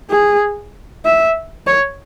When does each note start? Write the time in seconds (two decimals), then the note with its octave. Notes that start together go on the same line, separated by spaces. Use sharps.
0.10 G#4
1.05 E5
1.67 C#5